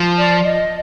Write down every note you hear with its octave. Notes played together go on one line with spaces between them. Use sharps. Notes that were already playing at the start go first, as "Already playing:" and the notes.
Already playing: F3
D5
D#5